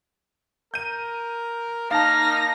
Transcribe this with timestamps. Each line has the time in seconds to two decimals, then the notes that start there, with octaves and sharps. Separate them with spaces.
0.74 A#4 G6 D#7
1.91 A#3 D#4 F5 A5 F6 A#6